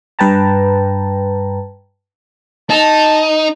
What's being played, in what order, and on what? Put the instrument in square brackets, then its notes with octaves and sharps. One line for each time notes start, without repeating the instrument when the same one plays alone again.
[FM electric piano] G2 B4 G5 A5 A#5
[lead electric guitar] D#4 [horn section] A5